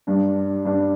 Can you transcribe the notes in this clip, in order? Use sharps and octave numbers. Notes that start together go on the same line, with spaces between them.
G2 G3 D4
G2 G3 D4